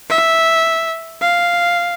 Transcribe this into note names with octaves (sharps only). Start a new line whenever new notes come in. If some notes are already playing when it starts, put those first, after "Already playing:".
E5
F5